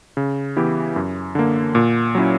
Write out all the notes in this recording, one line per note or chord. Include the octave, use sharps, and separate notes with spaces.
C#3
E3 B3 E4 G4
F#2
D3 A#3
A#2
F#3 C#4 E4